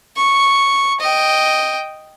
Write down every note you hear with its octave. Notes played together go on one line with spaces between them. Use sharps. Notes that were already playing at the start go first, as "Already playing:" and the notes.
C#6
D#5 G5